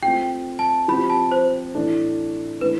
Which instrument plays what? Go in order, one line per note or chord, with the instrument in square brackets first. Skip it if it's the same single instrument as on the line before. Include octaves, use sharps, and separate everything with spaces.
[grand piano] A3 C4 F4 [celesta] G5
[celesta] A5
[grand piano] F3 C4 G4 [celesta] B5
[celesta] A5
C5
[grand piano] A2 E3 A3 D4
[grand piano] E3 A3 D4 [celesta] B4